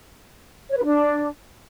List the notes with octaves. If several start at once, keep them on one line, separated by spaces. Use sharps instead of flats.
C#5
B4
D4